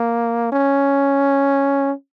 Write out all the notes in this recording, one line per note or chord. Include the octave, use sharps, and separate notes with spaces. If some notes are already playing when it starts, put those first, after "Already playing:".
Already playing: A#3
C#4